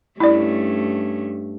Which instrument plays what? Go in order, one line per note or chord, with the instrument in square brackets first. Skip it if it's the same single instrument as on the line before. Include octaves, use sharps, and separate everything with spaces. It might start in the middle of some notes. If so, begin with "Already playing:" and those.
[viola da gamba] G2 A3 C#4 [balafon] E4 D5